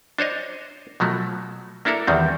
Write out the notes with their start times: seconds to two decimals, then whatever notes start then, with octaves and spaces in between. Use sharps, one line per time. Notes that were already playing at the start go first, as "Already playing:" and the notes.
0.19 D4 C5 C#5 D#5
1.00 B2 F3 F#3 A3
1.85 A#3 D4 E4 A4 A#4
2.07 E2 D#3 G3 C4